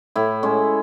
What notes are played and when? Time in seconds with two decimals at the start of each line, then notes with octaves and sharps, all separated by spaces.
0.16 A2 E4
0.43 G#3 C#4